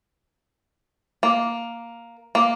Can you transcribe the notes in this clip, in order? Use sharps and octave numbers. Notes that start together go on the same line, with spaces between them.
A#3
A#3